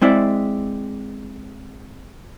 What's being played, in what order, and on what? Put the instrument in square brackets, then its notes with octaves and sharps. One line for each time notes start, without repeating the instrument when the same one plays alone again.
[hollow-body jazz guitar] G#3 C4 E4 D5